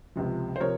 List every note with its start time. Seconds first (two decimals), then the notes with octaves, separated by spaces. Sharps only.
0.16 C#2 C3 F3
0.56 C5
0.60 C3 F3 A#4 C#5